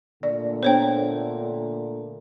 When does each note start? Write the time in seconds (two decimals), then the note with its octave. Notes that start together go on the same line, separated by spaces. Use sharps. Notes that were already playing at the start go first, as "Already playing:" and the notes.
0.23 A#2 D3 A3 D5
0.63 B3 D4 C5 C#5 G5